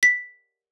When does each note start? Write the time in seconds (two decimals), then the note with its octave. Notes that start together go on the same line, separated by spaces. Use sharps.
0.03 B6